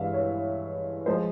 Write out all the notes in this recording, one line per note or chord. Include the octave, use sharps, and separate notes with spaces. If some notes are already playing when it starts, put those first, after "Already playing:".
Already playing: G2 E3 G#3 E5 F5
C#5
F3 G#3 C5